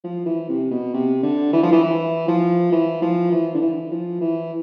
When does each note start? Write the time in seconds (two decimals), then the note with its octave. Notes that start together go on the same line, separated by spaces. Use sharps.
0.04 F3
0.26 E3
0.49 C3
0.71 B2
0.94 C3
1.23 D3
1.53 E3
1.63 F3
1.72 E3
1.83 E3
2.28 F3
2.72 E3
3.02 F3
3.32 E3
3.55 D3
3.62 E3
3.91 F3
4.21 E3